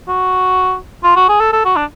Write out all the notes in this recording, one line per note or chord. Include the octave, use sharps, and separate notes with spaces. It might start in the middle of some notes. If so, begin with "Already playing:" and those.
F#4
F4
F#4
G#4
A4
A4
F#4
D4